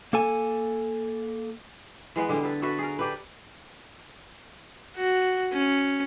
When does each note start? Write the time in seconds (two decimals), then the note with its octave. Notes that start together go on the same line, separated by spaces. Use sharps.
0.13 A#3 A4 G#5
2.16 E3 G#3 B3
2.29 D3 G3
2.43 A4 B4
2.62 F#4 A4 B4 E5
2.79 G#4 A#4
2.99 D4 G4 A4 B4
4.96 F#4
5.52 C#4